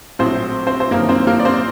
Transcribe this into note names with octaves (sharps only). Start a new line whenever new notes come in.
A#1 A2 F#3 C4 C5
C4 C5
C5
G1 F#2 D#3 A#3 A#4
C4 C5
A#3 A#4
D5
C4 C5